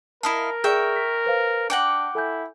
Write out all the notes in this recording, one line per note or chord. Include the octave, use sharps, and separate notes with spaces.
E4 A#4 D#5 F5 A5
G#4 D5 E5 G5 C#6
B6
B4 C5 F5
D4 F#5 G5 D6 A#6 C#7
E4 A4 G#5 G6